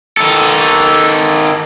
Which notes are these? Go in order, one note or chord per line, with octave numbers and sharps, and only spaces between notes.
D#3 A4